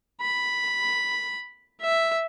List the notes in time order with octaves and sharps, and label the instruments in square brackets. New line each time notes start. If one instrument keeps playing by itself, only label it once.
[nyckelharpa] B5
E5